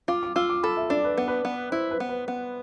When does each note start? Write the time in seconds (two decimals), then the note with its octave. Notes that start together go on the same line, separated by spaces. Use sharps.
0.08 F4 D6
0.23 D6
0.36 F4 E6
0.50 D6
0.63 A4 B5
0.77 E5
0.90 D4 D5
1.04 B4
1.18 B3
1.28 B4
1.45 B3
1.72 E4 C5
1.91 B4
2.00 B3
2.09 B4
2.28 B3